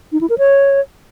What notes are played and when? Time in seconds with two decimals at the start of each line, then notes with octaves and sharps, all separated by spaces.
0.12 D#4
0.21 E4
0.30 A#4
0.38 C#5